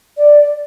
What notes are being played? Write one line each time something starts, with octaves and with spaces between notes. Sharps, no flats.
D5